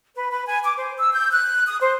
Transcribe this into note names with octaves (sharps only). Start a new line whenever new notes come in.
B4
B4
G#5
D6
C5
E6
G6
F#6
D#6
C5